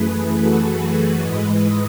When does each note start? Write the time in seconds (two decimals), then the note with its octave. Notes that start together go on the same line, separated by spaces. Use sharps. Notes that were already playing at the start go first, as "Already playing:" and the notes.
Already playing: F#2 E3 A3 G#4 B4
0.40 F#4 A4
0.81 G#4 B4
1.22 G#2 E3 G#3 B4 D#5